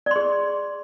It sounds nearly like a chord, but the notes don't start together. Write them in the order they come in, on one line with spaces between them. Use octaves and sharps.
D5 C6 G#4